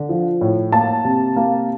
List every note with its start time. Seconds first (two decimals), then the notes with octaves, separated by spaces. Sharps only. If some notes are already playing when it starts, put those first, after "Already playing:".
Already playing: D3
0.09 F3
0.41 A2
0.72 A#3 A5
1.05 C3
1.36 A#3